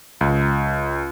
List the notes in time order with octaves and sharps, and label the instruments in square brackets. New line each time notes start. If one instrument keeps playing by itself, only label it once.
[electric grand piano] C#2